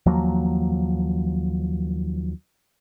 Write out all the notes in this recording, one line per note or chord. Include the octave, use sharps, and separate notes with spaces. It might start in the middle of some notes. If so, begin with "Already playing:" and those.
D#2 F3 F#3 A#3